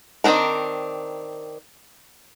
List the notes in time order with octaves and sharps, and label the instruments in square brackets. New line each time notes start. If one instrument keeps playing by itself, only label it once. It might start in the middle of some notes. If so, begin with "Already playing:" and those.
[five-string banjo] D#3 F#3 C4 D4 A#4